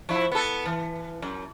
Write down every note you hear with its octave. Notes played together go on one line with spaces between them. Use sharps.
F3 E4
B3 A4
E3
F#2